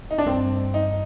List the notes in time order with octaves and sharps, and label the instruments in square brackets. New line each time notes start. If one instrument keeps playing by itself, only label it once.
[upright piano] D#4
D4
[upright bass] G2 [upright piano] C4
[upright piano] D#4